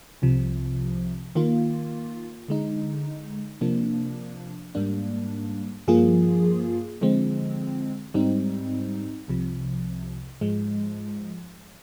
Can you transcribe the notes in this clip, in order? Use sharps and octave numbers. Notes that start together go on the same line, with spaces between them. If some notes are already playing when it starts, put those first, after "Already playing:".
C2 C3 F3
D#3 A#3 F4
D3 G#3 D#4
C3 F3 A#3 D4
G#2 G3 A#3 D4
G2 F3 A#3 F4 G#4
D3 F3 G#3 C4
G#2 G3 C4 D#4
C2 C3 F3
G#2 F3 G#3